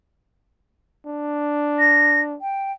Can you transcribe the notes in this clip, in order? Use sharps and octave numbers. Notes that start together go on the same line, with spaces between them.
D4
A#6
G5